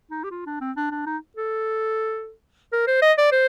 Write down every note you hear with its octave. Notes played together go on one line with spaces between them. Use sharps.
D#4
G4
F4
D4
C4
D4
D4
D#4
A4
A#4
C5
D#5
D5
C5